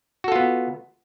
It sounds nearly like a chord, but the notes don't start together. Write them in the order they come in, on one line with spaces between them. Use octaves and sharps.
F#4 A4 F4 B3